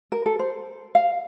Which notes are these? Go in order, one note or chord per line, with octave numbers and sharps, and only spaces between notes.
A#4
A4
C5
F5